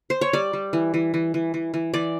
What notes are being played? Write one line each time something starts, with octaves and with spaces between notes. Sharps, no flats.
C5
C#5
G3 D5
G3
E3
E3
E3
E3
E3
E3
E3 D5